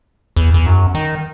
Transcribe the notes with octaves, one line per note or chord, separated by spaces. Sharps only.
E2
E2
F#2
D#3